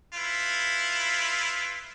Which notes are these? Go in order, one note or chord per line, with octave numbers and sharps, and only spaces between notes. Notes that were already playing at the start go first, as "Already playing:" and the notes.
E4 F4 B4